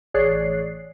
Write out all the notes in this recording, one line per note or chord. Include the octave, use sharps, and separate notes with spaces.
A1 G#4 C#5 D5 F#6 C7